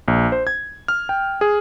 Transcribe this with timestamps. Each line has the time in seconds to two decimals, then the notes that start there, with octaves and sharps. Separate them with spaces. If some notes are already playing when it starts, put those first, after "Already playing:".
0.08 A#1
0.32 C5
0.47 G#6
0.88 F6
1.09 G5
1.41 G#4